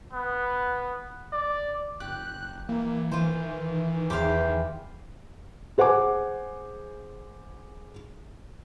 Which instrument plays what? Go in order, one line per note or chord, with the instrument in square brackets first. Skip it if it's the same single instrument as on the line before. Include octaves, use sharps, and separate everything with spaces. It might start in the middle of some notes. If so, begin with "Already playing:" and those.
[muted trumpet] B3
D5
[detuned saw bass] F#1 [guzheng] G4 [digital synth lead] F#6
[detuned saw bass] E3 [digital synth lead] A#3
[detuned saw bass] D#3 [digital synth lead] E3 [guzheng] F4 C5
[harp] E2 [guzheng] G4 C5 F5
[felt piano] G#4 C5 F#5 G#5 D6